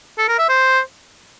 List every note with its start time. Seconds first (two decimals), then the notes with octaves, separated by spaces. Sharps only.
0.18 A4
0.28 A#4
0.39 E5
0.49 C5